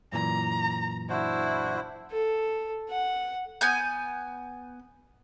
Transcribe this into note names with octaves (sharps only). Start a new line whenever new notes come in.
F#2 A#2 E3 A#5
D4 E4 F#4 C5
A4
F#5
B3 G#5 G6